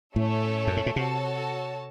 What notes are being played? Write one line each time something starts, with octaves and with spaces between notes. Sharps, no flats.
A2 A3 C#4 A4 C#5
F#2
A2
A#2
C3 F#4 A4 C#5 A5